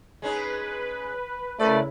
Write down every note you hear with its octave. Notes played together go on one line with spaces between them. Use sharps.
G#3 C#4 D#4 B4
C#3 A3 E4 A#4 B4 D5